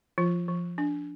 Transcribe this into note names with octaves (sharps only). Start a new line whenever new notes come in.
F3 F4
F3
D4